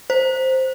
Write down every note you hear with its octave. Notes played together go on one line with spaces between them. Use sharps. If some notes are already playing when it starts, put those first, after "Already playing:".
C5